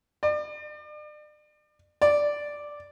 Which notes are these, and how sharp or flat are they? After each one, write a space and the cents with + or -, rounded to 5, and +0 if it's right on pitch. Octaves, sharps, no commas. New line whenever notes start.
D5 +40
D5 +0